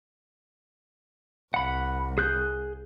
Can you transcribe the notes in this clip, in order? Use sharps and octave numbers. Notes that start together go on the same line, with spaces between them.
C2 F#5 B5
G#4 F#6 G6